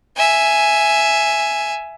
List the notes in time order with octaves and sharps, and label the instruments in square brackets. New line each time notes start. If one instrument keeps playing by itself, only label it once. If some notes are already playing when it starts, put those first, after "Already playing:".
[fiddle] E5 G#5